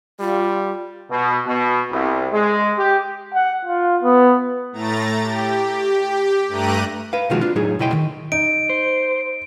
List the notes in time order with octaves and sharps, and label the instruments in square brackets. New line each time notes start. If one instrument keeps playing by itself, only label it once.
[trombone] G3 [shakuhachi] F4
[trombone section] B2
B2
C2
G#3
G4
[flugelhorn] F#5
F4
B3
[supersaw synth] A2 A3 A#5 A6
G4
G2 A3 G4 A#5 F#6 D#7
[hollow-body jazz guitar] B4 F5
B2 D#3 F3 G#3 F4 F#4
D4 F4
A2 F#3 D#4 G#4
C#2 B2 E4 D#5 G5 C6
D#3
[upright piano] D#4 [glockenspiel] D7
[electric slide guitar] C5